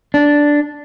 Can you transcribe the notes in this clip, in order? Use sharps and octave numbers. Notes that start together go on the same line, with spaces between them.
D4